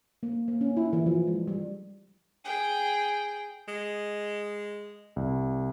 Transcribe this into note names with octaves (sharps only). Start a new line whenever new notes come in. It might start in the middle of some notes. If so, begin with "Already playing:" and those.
A#3
A#3
C#4
E4
E3
F3
G#3
G3
G#4 G5
G#3
C2